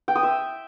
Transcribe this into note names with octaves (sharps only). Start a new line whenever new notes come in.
G5
D#6
E5